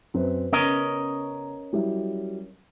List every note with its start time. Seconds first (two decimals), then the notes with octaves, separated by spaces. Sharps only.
0.14 F#2 C4 B4
0.53 C#3 B3 C#4 A#4 D#5 A#5
1.73 F#3 G3 E4